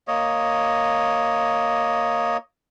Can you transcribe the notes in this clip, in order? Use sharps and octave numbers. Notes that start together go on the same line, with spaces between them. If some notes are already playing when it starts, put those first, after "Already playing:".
A#3 C#5 D#5